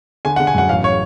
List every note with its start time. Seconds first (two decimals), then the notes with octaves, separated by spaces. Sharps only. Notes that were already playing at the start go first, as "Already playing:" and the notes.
0.25 D3 G#5
0.36 F#5
0.40 D3
0.47 G#5
0.54 F#2 F#5
0.69 A1 F5
0.84 C#5